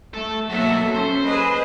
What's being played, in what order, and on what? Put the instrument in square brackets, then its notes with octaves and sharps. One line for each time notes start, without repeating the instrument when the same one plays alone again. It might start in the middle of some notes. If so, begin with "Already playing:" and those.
[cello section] A3 [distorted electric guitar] A4
[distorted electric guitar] B1 F#4 [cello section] F#3 A4 [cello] A#3 E5
[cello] C#4 [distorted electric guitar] C5
[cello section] G#4 B4 [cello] D#5